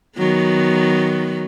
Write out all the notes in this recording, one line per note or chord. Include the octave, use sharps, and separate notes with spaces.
D#3 F#3 B3